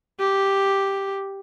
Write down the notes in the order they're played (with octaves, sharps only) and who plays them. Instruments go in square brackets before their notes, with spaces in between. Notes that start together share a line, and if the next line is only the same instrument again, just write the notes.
[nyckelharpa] G4